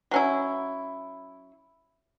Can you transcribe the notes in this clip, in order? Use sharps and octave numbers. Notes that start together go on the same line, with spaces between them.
F#3 C#4 E4